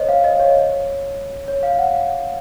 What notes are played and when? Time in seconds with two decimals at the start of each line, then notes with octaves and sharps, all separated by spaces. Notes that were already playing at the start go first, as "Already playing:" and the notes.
Already playing: C5 C#5 D#5
0.09 F5
0.24 D#5
0.39 C#5
1.48 C#5
1.63 F5
1.79 F#5